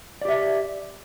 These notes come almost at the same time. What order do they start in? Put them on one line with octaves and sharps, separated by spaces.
D5 G4 E5